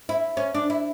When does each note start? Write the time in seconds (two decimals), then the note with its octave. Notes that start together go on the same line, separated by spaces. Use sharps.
0.09 E4
0.37 C#4
0.54 D4
0.70 E4